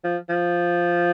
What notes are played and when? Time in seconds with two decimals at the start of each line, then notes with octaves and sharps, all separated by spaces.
0.04 F3
0.29 F3